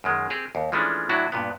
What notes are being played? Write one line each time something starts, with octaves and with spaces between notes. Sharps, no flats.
F#2 D#3 G#3
C4 G4 G#4
D#2
E3 F3 G#3 A3 C#4 D4
A2 F#3 D4 E4 F#4
G2 A#2 B3